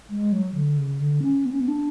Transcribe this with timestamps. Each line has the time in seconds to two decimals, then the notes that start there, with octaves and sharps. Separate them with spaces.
0.10 G#3
0.32 F#3
0.55 D3
0.78 C#3
1.00 D3
1.22 C#4
1.45 B3
1.52 C#4
1.60 B3
1.68 D4